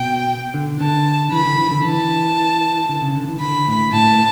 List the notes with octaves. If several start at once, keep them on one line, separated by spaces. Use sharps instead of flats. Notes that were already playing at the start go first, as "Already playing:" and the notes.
Already playing: B2 G5
D3
D3 A5
E3 B5
D3
E3
D3
E3 A5
D3
C#3
D3
E3
D3 B5
A2
A2 A5